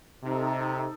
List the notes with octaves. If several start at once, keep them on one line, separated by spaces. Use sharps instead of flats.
C3 D#4 A4